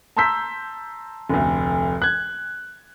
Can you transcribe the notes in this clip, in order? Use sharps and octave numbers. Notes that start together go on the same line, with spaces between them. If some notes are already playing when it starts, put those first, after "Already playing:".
A5 A#5 C6 E6 G6 B6
F1 D2
F#6 G#6